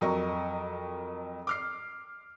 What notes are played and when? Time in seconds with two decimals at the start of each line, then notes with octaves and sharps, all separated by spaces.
0.01 F2 F#3 A#4 D#5 C#6
1.47 D6 F6 C7